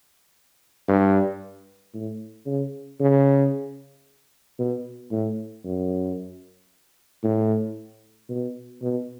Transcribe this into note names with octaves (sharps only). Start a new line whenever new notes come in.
G2
A2
C#3
C#3
B2
A2
F#2
A2
B2
B2